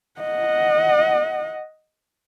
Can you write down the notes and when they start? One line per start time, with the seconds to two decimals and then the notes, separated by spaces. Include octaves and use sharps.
0.21 D#5 F#5